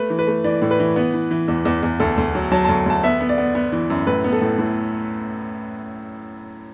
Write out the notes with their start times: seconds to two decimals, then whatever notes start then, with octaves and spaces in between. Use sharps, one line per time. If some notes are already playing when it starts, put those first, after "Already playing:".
Already playing: A3 B4
0.10 E3
0.19 B4
0.27 A3
0.44 E3 D5
0.62 A2
0.71 B4
0.79 E3
0.96 B3
1.14 E3
1.31 E3
1.48 E2
1.65 E2
1.83 E2
2.00 D2 A4
2.18 D2
2.35 F#3
2.52 F#3 A5
2.65 D2 A5
2.86 D2 A5
3.03 B3 E5
3.21 B3
3.29 D5
3.38 B3
3.55 B3
3.72 E3
3.90 F#2
4.07 A2 B4
4.24 B3
4.32 A4
4.41 A2
4.58 A2